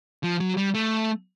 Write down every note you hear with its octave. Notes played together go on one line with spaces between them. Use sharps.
F3
F#3
G3
A3